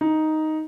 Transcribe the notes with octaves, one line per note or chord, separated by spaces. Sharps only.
D#4